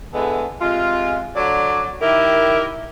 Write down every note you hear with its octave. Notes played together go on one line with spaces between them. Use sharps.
D3 E3 G#3 B3 A4
C3 G#3 F4
D3 F#3 D5
D#3 E4 G4 A#4